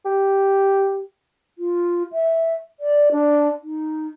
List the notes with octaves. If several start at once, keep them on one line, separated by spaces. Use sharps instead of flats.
G4
F4
E5
D5
D4
D#4